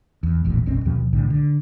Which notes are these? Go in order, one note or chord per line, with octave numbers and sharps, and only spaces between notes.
E2
E1 A#1 E2 A2
F1 A#1 C4 C#4
D#2 B2 F3
B1 A2 D3
D3